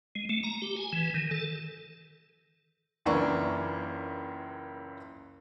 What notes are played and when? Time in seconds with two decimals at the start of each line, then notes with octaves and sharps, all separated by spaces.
0.15 G#3
0.29 A3
0.43 A#5
0.62 G4
0.76 G#5
0.93 E3
1.14 D#3
1.31 A4
3.06 F#1 C#2 E3 A#3 D4 C#6